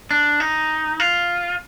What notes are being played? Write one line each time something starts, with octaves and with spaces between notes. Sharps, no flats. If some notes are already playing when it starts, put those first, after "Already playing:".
D4
D#4
F4